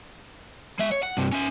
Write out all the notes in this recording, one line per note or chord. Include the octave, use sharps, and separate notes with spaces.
G#3 E5
C#5
F#5
G2 C3
C#4 E5